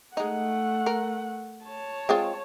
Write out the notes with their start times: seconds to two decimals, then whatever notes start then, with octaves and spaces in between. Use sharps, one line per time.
0.17 G#3 A3 D#4 F#5
0.86 A#4
1.64 C#5 A5
2.09 G#3 C4 F4